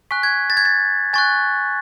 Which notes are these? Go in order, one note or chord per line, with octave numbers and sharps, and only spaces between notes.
G#5 C#6 F#6 B6
G#6
A6
G#6
A6
G#5 C#6 F#6 A6